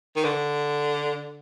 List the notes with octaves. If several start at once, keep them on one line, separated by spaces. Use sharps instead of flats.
D#3
D3